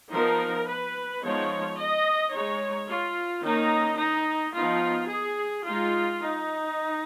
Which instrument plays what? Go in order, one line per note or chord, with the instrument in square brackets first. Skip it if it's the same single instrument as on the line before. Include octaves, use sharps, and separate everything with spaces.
[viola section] F3 B3 D#4 A#4
B4
F3 G#3 B3 D#4 C#5
D#5
G#3 D#4 C#5
F4
D#3 A#3 C#4 D#4
D#4
F3 B3 D#4 F4
G#4
G#3 D#4 F4
D#4